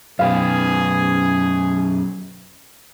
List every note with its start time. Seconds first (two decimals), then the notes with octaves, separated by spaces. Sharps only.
0.19 F#2 B2 G4 G#4 B4 F5